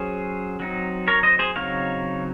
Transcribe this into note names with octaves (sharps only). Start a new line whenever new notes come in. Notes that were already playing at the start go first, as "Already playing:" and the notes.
Already playing: F#3 C#4 G#4 C5
F#3 C4 D#4
A#4 C#5
C5 D#5
G#4 C5
C#3 F#3 C4 D#4 C#5 F5